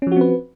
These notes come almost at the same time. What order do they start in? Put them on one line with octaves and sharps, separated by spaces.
C#4 F3 F#4 C4 B4